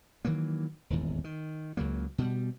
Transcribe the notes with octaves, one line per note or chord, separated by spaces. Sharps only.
D#3 E3 F#3 A#3
D#1 G#1 E2
D#3
C#2 C#3 F#3 A#3
B2 G3